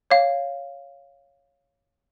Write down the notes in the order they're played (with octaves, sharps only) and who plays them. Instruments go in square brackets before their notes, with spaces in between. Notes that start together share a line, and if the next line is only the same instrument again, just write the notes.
[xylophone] C#5 F5